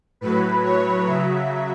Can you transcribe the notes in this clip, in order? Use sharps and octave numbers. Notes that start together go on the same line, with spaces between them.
A2 F#3 B4
C#5
C#3 F#3 E5